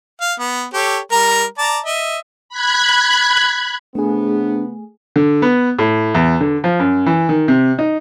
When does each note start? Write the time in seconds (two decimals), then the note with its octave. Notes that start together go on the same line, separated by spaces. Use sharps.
0.21 F5
0.39 B3
0.74 G4 A4 C#5
1.12 G3 A#4 A#5
1.58 D5 A5 A#5
1.86 D#5 E5
2.49 B5 F#6 G#6
3.95 C3 A3 B3 D4 G#4
5.16 D3
5.42 B3
5.79 A2
6.15 E2
6.41 D3
6.64 F3
6.80 F#2
7.06 E3
7.29 D#3
7.48 C3
7.79 D#4